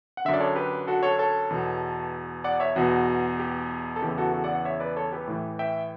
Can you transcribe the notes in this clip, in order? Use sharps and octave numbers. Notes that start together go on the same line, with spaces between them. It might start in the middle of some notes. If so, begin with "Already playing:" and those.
F#5
F#2 D3 E5
D5
A4 C#5
G4 B4
F#4 A4
A4 C#5
A4 C#5
E2 B2
D5 F#5
C#5 E5
E2 B2 F#4
G4
A4
E2 C#3 E3 G4
F#4 A4
F#4 A4
D5 F#5
D5 F#5
C#5 E5
B4 D5
A4 C#5
G4 B4
A2 E3
E5 G5